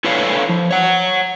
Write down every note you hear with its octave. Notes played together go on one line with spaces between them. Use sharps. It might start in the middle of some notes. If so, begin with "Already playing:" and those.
E4 A4 B4 C#5 F5
F3
C#5 F#5